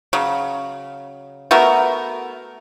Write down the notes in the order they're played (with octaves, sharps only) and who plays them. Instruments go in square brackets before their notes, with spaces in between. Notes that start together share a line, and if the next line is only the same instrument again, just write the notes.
[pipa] C#3 F#3
A3 B3 F#4 A#4